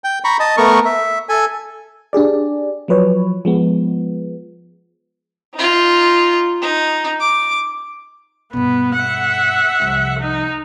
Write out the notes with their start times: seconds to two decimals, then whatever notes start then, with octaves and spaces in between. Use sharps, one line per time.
0.04 G5
0.24 A#5 B5 C#6
0.40 D#5 A5
0.57 A3 B3 A#4 C#6
0.85 E5
1.29 A4 G#5
2.13 D4 G4 G#4 D5
2.88 F3 F#3 B4 C#5
3.45 F3 G#3 B3
5.54 D#4 F4
6.62 D#4
7.20 D6
8.53 G2 B2 B3
8.95 E5 F#5
9.80 C2 F3
10.19 D#4